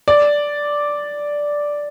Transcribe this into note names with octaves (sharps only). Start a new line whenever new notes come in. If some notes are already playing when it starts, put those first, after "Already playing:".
D5